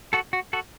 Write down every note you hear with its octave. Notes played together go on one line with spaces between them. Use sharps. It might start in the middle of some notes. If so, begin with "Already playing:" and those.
F#4 A4
F#4
F#4 A4